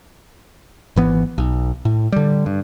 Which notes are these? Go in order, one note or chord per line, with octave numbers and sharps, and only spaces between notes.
G#1 E3 B3
B1
A2
D3 G3
G2